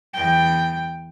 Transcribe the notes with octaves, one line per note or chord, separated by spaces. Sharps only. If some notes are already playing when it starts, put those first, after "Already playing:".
E2 G5